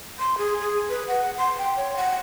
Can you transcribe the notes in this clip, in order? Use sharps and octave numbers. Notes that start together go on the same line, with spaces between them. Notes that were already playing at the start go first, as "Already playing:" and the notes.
C6
G#4
G#4
B4
F#5
C6
G5
C#5
F#5